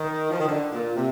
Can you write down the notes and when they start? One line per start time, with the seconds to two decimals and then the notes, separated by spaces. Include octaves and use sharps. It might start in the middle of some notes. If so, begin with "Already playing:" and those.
Already playing: D#3
0.31 F3
0.40 D#3
0.48 D3
0.72 A#2
0.97 C3